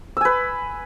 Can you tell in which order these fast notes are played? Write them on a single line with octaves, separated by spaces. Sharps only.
E6 G#5 B4